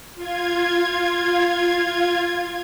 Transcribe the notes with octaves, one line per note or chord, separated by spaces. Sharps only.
F4 G#6